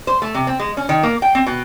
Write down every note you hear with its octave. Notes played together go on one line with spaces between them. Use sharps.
C5
A3
C3
C4
G#3
C#4
D#3
A#3
G5
C4
B2